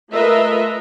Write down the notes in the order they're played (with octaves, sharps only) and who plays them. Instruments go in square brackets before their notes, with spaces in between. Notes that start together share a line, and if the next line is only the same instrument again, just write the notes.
[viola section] A3 F4 A#4 B4 D#5 E5